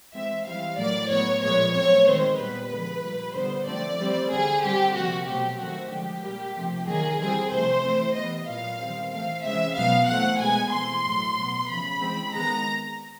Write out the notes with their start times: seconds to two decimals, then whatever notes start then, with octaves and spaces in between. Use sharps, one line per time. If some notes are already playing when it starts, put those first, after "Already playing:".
0.14 E3 G#3 C4 E5
0.46 E3 G3 C4 F5
0.78 A2 F#3 A#3 D5
1.10 A2 F#3 B3 C#5
1.42 A#2 F3 G#3 B3 C#5
1.74 A#2 F#3 A3 C4 C#5
2.06 D#3 G#3 C4 C5
2.38 A#2 G3 B3 B4
2.70 D3 F3 G#3
3.03 A#2 G3 A#3
3.35 D3 G3 B3 C5
3.67 D3 F3 A3 C4 D5
3.99 E3 G3 C4
4.30 D3 G3 C4 G#4
4.63 D3 G3 C4 G4
4.95 C3 F3 A#3 F#4
5.27 B2 F#3 A3 C4 G4
5.59 D#3 F#3 A3 C4 F#4
5.91 D3 F3 G#3 G4
6.23 A#2 G3 A#3
6.55 C3 F3 A3
6.87 D#3 F#3 A#3 G#4
7.19 E3 G3 C4 G#4
7.51 C3 F3 A3 C5
7.83 E3 A3 C4
8.16 E3 G3 B3 D#5
8.47 A#2 F#3 B3 F5
8.79 D#3 G3 C4
9.12 E3 A3 C4 F5
9.44 C#3 E3 G#3 C4 E5
9.75 B2 F#3 B3 F5
10.08 E3 A3 C4 F#5
10.40 B2 G#3 B3 G#5
10.72 E3 A3 C4 C6
11.05 A2 F#3 A3
11.36 B2 F#3 B3
11.69 C#3 F3 A3 B5
12.00 E3 G#3 C4
12.32 D#3 G#3 B3 A#5